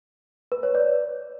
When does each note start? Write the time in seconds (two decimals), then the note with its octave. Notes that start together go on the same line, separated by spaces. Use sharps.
0.52 B4
0.63 C#5
0.75 D5